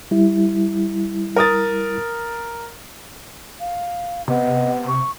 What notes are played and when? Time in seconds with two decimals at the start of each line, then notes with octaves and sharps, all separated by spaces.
0.11 G3 E4
1.36 A#4 D#6 A6
3.60 F5
4.28 C3 B3 D#5
4.88 C#6